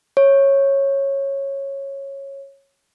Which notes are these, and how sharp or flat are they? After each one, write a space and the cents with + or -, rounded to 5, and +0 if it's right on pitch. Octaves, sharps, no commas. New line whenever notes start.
C#5 -10